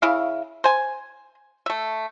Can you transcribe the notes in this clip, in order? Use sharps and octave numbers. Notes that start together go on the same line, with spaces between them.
C#3 E4 F5
C5 G#5
A3 E5